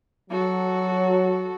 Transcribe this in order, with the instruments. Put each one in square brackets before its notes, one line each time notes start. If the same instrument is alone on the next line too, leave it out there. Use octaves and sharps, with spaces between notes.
[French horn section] F#3 [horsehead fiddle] F#4 A4